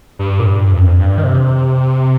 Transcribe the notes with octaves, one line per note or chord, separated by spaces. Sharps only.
G2
A#2
G2
F2
G2
D#3
C3